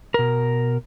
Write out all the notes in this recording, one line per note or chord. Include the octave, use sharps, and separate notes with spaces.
B2 A#4